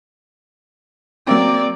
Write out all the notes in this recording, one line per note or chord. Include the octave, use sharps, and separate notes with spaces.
F#3 A#3 C4 D5